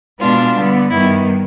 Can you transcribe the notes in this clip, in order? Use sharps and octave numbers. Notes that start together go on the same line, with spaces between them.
B2 G#3 B3 D4 F4
D3 G3 B3
G2 D#3 G3 B3 E4